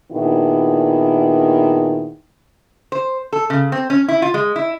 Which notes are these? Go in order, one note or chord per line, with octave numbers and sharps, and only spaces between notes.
A#2 D#3 B3 D4 E4 G#4
C5
A4
C#3
C4
C#4
E4
F4
G#3
E4